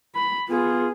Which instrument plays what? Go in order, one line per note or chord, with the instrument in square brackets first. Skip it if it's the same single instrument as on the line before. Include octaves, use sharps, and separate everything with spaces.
[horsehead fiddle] B5
[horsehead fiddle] B3 G#4 [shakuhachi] F4